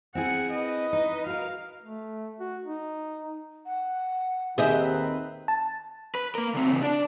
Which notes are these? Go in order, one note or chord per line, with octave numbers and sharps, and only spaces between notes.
C4 E4 G#4 F#5
B4 D#5
D#4
F#4 A#4 F5
A3
F#4
D#4
F#5
D#2 D#3 C4 G4 G#4 B4 D#5 E5
A5
B4
A#3 A#4
D3 C4
C#3 E3
D4 D5